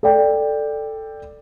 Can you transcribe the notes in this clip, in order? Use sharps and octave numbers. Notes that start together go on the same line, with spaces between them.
A4 D5 G5